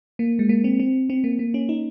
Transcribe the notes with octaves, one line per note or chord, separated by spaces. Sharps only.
A#3
G#3
A#3
C4
C4
C4
A#3
A#3
C#4
D#4